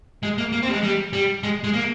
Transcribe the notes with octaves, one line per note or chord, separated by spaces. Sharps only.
G#3
A#3
A#3
C4
G3
G#3
G3
G3
G#3
G#3
A#3